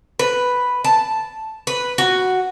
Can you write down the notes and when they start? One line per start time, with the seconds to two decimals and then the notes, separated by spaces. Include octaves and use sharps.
0.19 B4
0.84 A5
1.67 B4
1.98 F#4